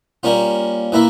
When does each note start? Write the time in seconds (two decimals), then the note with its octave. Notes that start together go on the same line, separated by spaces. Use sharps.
0.23 G3 A#3 C#4 F4
0.92 E3 A#3 E4